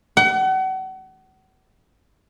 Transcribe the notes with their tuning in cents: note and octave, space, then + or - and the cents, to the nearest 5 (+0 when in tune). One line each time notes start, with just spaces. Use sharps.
F#5 +35